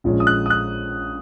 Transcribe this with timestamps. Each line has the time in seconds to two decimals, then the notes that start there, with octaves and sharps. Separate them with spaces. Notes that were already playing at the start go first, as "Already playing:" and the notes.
0.04 A#1 A#2 G#3 C#4
0.20 D#6
0.27 F#6
0.46 D#6
0.50 F#6